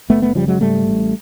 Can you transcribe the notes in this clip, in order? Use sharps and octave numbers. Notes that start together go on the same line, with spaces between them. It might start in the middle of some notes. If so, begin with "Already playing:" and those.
F#1 A3 B3
A3 B3
C#3 F3 G3
F#3 G#3
G#2 G3 A3
A1